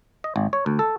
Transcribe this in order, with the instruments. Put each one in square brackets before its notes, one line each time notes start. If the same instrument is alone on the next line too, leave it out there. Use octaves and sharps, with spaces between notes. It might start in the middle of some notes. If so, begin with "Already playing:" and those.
[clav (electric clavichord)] D#5
G#1
C#5
D2
A4